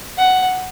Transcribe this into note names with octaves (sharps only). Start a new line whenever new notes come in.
F#5